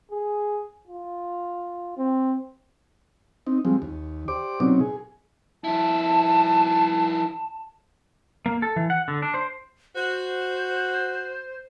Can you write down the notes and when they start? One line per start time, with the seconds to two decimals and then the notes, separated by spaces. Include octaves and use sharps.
0.11 G#4
0.87 F4
1.98 C4
3.47 C4 D#4
3.65 F3 G3 G#3 C4
3.82 D#2
4.28 G4 C5 D5 D6
4.60 B2 F#3 C4 C#4 D#4
4.80 G#4
5.64 F3 E4 A5
8.46 A#3
8.62 A4
8.76 E3
8.90 F#5
9.08 D3
9.22 D4
9.34 C5
9.95 F#4 C5